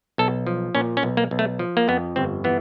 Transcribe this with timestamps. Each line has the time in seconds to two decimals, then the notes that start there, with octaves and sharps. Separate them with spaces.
0.18 B1 A4
0.47 F3
0.75 A#2 C#4
0.97 C#4
1.03 B1
1.17 A#3
1.31 B1
1.39 A3
1.59 F3
1.77 A#3
1.88 F2 B3
2.16 G1 C4
2.44 E3 B3